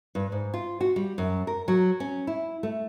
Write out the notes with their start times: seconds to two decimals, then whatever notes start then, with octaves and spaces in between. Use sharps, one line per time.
0.15 G2
0.32 G#2
0.54 F4
0.81 F#4
0.96 G3
1.18 F#2
1.47 A#4
1.68 F#3
2.00 C#4
2.27 E4
2.63 A3